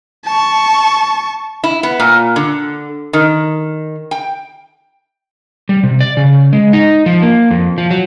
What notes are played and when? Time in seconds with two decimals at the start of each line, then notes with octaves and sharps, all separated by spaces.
0.25 A5 C#6
1.64 E4
1.83 B3
2.00 A#2
2.36 D3
3.13 D#3
4.11 G5
5.69 G3
5.83 C3
6.01 D5
6.17 C#3
6.53 G#3
6.73 D#4
7.06 F3
7.22 A#3
7.51 F2
7.78 F3
7.91 F#3